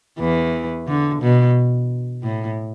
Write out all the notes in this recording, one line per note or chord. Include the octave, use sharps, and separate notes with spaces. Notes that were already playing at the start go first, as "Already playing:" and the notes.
E2 E3
D3
B2
A2